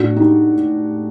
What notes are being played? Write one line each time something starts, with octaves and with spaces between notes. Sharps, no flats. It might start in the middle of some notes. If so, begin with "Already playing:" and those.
Already playing: A2 D4 F#4
D#4 G4